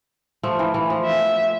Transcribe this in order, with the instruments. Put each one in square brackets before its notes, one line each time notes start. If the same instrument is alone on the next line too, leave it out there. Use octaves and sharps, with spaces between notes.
[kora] F3 A3
E3
E3
F3
[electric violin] E5